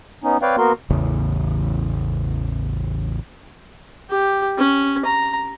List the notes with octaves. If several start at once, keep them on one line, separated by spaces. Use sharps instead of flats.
B3 C#4 D#4
C4 B4 C#5 D5 F5 G5
A#3 B3 F#4 A#4 C6
A1 E2 C#3
G4
C#4
A#5